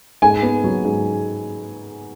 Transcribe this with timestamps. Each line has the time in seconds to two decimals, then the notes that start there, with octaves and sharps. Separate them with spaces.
0.22 G#2 G#5
0.43 B3
0.64 F#3
0.85 G#2